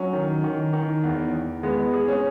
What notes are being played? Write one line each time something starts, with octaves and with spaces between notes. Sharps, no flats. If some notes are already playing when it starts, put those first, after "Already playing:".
Already playing: F#3 C#4
D#3
D#3
D#3
E2
E2
G#3 B3
G#4
C#4